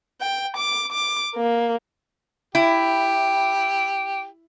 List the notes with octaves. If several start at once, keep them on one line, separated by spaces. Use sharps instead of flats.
G5
D6
D6
A#3
E4 G4